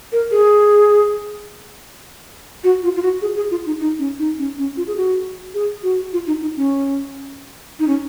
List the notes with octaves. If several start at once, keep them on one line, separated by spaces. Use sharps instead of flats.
A#4
G#4
F#4
F4
F4
F#4
G#4
G#4
F4
D#4
D#4
C#4
D#4
C#4
C#4
F4
G#4
F#4
G#4
F#4
F4
D#4
D#4
C#4
D#4
C#4